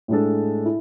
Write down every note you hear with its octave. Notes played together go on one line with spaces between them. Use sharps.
A2 G#3 D4 A4
E4